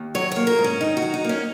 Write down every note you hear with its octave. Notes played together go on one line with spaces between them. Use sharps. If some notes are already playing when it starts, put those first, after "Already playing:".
Already playing: D#2
F#3 C#5
A#3 C#5
A#4
G#2
C#4
D#3 D#4
F#4
F#3
D#4
A#3 C#4